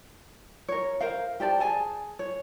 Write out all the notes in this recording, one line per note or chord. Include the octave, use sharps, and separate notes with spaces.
A#4 C#5
A#4 C5 F5
G4 C5 D5 A5
G#4 G#5 A5
C#5